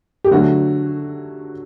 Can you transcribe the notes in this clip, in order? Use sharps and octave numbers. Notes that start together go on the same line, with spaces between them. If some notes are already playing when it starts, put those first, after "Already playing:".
G4
D3 F#3 A3 F#4